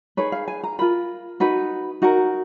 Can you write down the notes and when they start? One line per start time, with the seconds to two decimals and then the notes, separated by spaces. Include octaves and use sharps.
0.17 D#4 G#4 B4 C#5
0.32 F5
0.48 G#5
0.64 A#5
0.79 F4 A#4 B5
1.40 D#4 F#4 B4
2.02 D#4 F#4 A#4